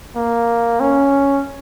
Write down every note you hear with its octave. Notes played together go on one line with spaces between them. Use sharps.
A#3
C#4